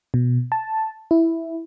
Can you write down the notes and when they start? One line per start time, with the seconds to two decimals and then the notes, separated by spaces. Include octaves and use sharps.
0.14 B2
0.52 A5
1.11 E4